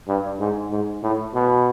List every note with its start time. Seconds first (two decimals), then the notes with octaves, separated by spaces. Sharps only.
0.08 G2
0.40 G#2
0.72 G#2
1.03 A2
1.35 B2